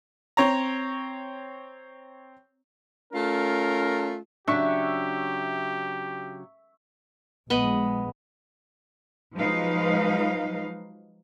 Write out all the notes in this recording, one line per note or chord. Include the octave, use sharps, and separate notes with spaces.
C4 C#5 A#5
A3 C#4 F4 A#4
C#3 F#3 D4 G4 E5 C#6
A#1 G#3 B3 D#5 B5
F3 F#3 G#3 D#4 B4 F5